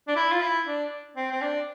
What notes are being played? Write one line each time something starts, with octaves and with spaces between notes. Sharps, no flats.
D4
E4
F4
E4
D4
C4
C4
D4